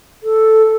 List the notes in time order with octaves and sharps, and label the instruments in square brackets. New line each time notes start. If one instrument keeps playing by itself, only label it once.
[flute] A4